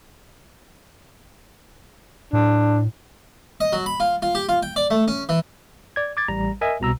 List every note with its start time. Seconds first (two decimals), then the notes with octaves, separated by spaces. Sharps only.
2.33 A2 D4
3.61 D#5
3.73 F#3
3.86 B5
4.00 F4
4.22 F4
4.35 G4
4.49 F4
4.63 G5
4.76 D5
4.90 A3
5.08 C#4
5.29 E3
5.96 D5 G#6
6.17 D6 G#6 A6
6.28 A1 G3 A#5
6.61 A#4 D#5 E5 G#5
6.80 C2 B2 A#5 E6